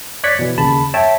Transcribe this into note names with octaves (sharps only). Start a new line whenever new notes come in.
C#5 D5 F#6 G#6 B6 C#7
B2 E3
D#2 C#3 A5 B5
C#5 E5 G5 A5